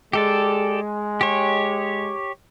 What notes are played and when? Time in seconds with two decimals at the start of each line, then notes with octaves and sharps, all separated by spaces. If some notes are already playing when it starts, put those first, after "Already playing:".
0.13 G#3 G4 A4 D5
1.21 G4 C#5